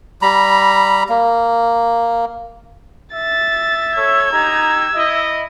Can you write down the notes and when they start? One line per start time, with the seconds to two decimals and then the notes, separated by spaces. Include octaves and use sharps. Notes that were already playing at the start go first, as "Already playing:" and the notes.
0.22 G3 A#5 B5
1.09 A#3
3.14 E5 A6
3.97 A4 C#5 E6 G#6
4.33 D#4 G4 A#5
4.95 E4 D#5 E5